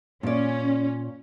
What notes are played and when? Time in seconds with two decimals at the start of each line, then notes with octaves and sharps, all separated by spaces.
0.23 A#2 C#4 D5